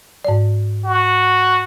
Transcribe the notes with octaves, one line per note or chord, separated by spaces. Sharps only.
G#2 D5
F#4